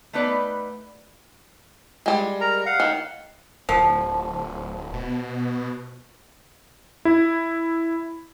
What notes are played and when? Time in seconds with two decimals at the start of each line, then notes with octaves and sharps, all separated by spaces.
0.13 A3 B3 D#4 B4 D5
2.06 G3 G#3
2.41 A#4 A#5
2.66 F5 F#5
2.80 D#3
3.69 D1 F3
4.93 B2
7.05 E4